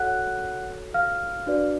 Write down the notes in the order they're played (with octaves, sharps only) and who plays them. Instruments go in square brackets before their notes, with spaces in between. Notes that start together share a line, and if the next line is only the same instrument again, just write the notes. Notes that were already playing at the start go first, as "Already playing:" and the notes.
Already playing: [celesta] F#4 A4 C#5 F#5 F#6
F5 F6
D4 F#4 B4 D5